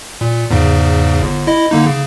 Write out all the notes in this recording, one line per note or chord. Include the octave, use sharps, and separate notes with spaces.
A#2
E2 G#2 C#3
G1
E4 D#5
D3 A#3 D#4
C#3